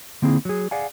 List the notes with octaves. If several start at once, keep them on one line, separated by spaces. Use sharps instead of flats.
D3 A#3 C4 D#4 E4 G#4
F#3 G#4
G#4 D5 F5 F#5 G#5